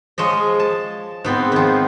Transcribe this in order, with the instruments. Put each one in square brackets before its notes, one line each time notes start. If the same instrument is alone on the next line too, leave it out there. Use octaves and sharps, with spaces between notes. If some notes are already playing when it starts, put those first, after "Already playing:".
[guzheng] F3 G#3 C#5 D#5
A5
G#2 B3 C4
D#3 F3